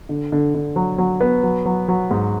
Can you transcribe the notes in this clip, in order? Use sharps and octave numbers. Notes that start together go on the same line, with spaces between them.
D3
D3
D3
F#3
F#3
B3
F#3
F#3
F#3
G#2